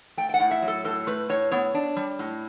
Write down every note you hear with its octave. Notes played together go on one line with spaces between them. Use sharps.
A3 G5
G5
F#5
A2
E5
F#3
A4
A2 A4
A3 B4
A2 C#5
B3 C#5
D4
G3
A2